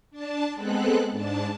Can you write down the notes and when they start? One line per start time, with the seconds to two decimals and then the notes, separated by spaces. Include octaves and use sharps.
0.11 D4 A5
0.55 G#3 B3 C4 A4 F#6
1.11 G#2 D4 A5